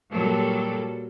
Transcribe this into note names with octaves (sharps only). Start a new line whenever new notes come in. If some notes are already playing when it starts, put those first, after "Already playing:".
A#2 F#3 G3 A4